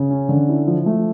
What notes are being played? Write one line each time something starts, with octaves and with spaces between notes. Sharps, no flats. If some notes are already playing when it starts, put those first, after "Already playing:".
Already playing: C#3
C#4
D3
E4
F3
A3